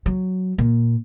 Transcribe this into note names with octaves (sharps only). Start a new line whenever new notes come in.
F#3
A#2